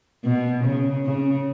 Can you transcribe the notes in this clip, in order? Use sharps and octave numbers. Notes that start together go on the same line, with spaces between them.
B2
C#3
C#3